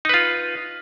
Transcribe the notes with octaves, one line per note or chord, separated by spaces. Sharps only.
D#4 F4 B4